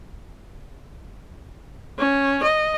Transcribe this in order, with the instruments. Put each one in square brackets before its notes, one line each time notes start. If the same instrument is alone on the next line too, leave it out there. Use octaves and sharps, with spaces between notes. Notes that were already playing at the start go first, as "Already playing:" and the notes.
[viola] C#4
D#5